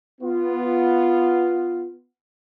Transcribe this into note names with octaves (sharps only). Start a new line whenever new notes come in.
B3 F4